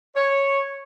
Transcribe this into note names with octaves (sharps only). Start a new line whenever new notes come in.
C#5